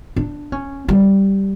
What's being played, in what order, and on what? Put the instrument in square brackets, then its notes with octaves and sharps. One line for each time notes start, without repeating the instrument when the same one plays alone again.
[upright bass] D4
C#4
G3